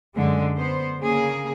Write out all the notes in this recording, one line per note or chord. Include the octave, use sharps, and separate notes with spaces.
F#2 D3 G#3
B3 C5
C#3 A#3 G#4